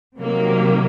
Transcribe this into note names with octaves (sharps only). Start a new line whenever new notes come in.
C3 D#3 F#3 A#3